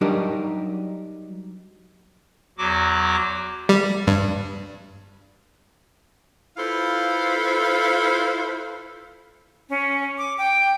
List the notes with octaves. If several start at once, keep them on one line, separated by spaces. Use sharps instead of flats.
F#3 G3 D4 D#4 G4 A#4
E2 F#3 F#4 D6
G3
G2
E4 F4 A4 B4 C5 F5
C#4
D6
G5